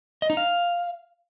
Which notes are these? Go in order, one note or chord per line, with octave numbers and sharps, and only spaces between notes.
D#5
D#4
F5